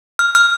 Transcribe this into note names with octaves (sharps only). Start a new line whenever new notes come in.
F6
F6